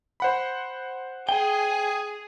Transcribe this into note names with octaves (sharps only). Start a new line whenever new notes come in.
C5 F#5 B5
G#4 G5